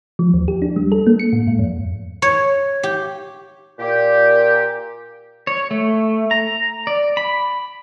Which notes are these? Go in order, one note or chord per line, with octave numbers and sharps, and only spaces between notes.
F3
D#2
G4
D4
G3
A4
A#3
C#7
A2
G#2
F2
C#5
G4
A#2 G4
C#5
A3
A#5
D5
B5